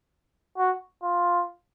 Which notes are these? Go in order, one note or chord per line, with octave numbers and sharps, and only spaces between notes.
F#4
F4